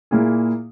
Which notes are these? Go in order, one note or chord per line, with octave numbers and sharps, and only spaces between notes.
A#2 A#3 E4 G#4